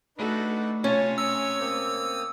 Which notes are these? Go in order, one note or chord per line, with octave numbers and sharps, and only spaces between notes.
A3 D4 D#4 F#4 A4 B4
C3 C#4 F4 C#5 G#5 A5
A#5 D#6 E6
A#3 C4 D#6